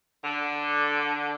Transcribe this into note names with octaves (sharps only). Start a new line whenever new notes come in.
D3